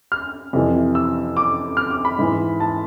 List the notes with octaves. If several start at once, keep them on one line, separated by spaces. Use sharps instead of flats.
F6
F2 C3 E3
E6
D6
F6
D6
B5
G#2 E3
A5